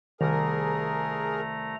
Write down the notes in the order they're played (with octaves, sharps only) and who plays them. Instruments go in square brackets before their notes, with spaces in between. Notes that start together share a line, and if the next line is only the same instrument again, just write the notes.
[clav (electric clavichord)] C2 G3 [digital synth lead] D#3 [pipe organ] A3 A#5 [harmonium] G#4 A#4